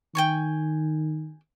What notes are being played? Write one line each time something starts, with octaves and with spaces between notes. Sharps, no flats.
D#3 G5 G#5 C#6